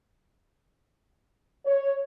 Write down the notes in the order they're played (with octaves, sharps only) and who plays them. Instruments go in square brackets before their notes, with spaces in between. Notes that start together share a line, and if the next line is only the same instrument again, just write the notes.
[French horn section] C#5